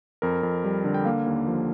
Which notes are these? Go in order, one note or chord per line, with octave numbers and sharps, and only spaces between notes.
F2 A#4
F2
G3
D3
G5
A#3 F5
D#2
F3